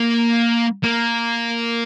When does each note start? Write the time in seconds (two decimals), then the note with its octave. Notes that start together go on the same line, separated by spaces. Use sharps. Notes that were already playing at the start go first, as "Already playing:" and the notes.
Already playing: A#3
0.84 A#3